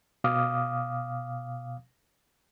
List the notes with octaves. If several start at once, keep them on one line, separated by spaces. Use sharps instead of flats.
B2 F5 D6 D#6